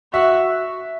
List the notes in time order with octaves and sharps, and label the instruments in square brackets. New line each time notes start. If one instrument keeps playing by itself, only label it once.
[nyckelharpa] F#4 [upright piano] E5